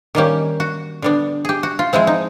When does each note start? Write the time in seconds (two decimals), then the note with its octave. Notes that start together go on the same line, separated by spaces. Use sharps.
0.15 D#3 G3 A#3 C#4 G4
0.60 F#4
1.02 D3 G3 B3 D4
1.45 G4 G#4
1.63 F#4
1.79 F4
1.93 F3 G#3 C4 E4
2.07 D#4